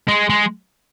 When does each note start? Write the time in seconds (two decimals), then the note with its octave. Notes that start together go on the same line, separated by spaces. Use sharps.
0.08 G#3
0.30 G#3